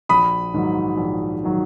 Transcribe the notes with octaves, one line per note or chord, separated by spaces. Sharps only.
A#1 B5 D#6
G#2 D#3 F#3
A#1
D#3 F#3